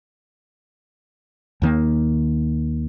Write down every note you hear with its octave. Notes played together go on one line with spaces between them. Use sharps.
D#2 D#3 A#3